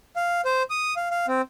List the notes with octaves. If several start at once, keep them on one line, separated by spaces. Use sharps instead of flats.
F5
C5
D#6
F5
F5
C4